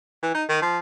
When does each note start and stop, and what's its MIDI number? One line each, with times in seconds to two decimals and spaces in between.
0.22 0.32 52
0.34 0.44 63
0.49 0.61 51
0.62 0.78 53